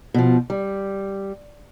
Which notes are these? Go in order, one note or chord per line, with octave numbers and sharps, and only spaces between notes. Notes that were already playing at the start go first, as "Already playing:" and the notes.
B2 F3
G3